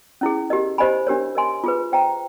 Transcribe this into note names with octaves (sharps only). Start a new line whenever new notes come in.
C#4 E4 G#4
G4 A#4 D#5
G4 C5 D#5 G#5 B5
D4 G4 A#4 C#5
A#4 D#5 G#5 C6
F4 G#4 B4
C5 D#5 G5 A#5